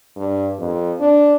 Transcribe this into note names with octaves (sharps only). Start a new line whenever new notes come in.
G2
F2
D4